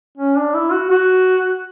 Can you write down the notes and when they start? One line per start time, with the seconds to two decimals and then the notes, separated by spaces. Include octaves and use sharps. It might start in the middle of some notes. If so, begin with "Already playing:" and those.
0.18 C#4
0.36 D4
0.54 E4
0.72 F#4
0.90 F#4